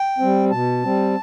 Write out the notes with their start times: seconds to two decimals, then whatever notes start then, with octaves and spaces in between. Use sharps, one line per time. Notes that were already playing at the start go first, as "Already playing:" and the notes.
Already playing: G5
0.18 G3 C4
0.51 B2 A5
0.84 G3 C4